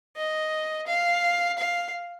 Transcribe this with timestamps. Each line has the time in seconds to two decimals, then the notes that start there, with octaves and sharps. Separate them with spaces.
0.16 D#5
0.87 F5
1.58 F5